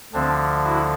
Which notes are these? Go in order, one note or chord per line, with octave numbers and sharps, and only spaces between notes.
D2 D3 F3 C4 D4
E4 F#4